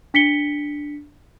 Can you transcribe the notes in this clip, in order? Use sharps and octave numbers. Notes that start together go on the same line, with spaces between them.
D4 B6 C#7 G7